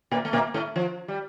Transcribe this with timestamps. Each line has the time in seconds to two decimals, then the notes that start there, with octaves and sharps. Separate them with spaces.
0.11 A#2 A#3
0.25 A3
0.33 A#2 A#3
0.54 A2 A3
0.76 F3
1.08 G3